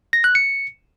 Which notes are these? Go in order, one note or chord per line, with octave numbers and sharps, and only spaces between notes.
A#6
F#6
C#7